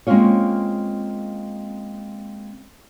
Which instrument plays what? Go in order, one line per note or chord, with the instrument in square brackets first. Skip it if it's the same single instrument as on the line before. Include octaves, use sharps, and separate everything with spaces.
[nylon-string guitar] G#3 A#3 C4 C#4 F4 C#5